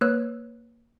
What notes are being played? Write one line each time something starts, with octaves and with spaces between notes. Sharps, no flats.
A#3 B4 C#5 E6 F#6